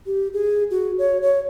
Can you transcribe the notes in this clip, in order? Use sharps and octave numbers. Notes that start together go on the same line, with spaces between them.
G4
G#4
F#4
C#5
C#5